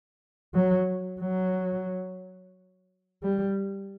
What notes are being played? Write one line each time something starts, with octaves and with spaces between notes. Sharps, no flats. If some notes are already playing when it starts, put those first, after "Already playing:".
F#3
F#3
G3